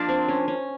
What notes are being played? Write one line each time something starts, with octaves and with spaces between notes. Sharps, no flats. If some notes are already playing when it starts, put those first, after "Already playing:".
Already playing: F3 A#3 D4
C4
C#4
C#4